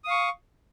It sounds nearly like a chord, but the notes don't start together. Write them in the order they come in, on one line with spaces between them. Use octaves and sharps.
D#6 F5 C#6